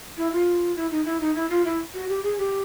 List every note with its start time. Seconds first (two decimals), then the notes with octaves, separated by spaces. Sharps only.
0.17 E4
0.32 F4
0.76 E4
0.91 D#4
1.05 E4
1.20 D#4
1.35 E4
1.49 F4
1.65 E4
1.94 F#4
2.09 G4
2.23 G#4
2.38 G4